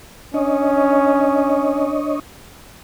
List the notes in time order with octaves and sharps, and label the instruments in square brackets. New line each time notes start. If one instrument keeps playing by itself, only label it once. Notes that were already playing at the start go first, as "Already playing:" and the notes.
[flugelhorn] C#4 [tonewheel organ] D4 C#5 D#5